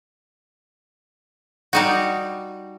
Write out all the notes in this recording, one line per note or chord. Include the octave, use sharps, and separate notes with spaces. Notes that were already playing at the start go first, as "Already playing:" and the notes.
G3 D#4 F#4